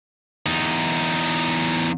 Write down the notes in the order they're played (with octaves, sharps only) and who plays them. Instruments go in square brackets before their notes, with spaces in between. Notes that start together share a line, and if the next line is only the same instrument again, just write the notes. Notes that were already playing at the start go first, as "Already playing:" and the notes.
[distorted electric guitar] E2 D#4